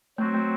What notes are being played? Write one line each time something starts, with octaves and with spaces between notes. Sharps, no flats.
F#3 A3 C4 F#4
A3